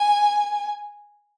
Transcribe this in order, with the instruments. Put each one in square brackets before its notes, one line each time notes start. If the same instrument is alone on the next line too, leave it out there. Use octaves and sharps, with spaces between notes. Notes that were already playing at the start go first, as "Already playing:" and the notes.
Already playing: [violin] G#5